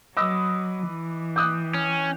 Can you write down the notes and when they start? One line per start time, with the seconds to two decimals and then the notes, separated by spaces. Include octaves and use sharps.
0.17 F#3 B4 D#5 D6 E6
0.89 E3
1.36 G5 D6 D#6 F#6
1.74 C#4